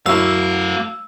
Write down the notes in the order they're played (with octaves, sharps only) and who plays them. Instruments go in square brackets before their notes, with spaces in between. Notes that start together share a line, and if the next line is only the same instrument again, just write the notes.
[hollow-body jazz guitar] F#2 E4 [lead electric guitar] A3 F5 [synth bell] E6